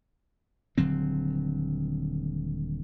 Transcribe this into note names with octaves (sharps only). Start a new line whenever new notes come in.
D#1 D3 F#3 C4